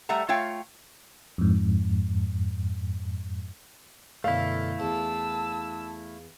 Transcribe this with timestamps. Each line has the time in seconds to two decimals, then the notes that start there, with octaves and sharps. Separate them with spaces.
0.09 G3 A3 E5 F#5 A#5
0.29 A3 F4 C#5 F5 G5
1.38 F2 G#2
4.24 F#2 B2 D3 A3 E4 F5
4.80 E2 A5 E6